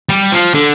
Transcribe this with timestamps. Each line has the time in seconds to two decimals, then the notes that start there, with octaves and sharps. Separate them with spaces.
0.09 G3
0.32 F3
0.54 D3